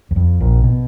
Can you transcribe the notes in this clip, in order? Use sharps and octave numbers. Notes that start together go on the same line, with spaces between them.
E2
F2
A#1 A#2
B2